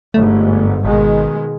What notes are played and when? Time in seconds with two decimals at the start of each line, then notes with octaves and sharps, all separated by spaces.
0.14 G1 G#2 A3
0.85 G#1 B2 D#3 G#3